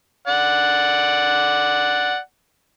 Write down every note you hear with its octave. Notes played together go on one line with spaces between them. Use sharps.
D5 F#5